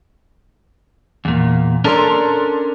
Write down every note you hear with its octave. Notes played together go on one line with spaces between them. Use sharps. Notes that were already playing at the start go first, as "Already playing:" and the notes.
E2 A#2
C#4 D4 A4 A#4 D5 C6